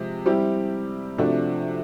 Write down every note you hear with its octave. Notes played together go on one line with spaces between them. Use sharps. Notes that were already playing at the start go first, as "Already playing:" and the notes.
Already playing: C3 F3 G#3
G3 C4 E4 G4
C3 F3 A3 D4 F#4